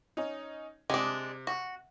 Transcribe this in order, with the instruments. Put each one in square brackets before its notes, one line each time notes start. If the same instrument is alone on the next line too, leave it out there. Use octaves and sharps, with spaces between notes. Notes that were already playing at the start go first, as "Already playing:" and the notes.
[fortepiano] C#4 D#4
[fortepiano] C3 [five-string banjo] G#3 D4
[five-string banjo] F#4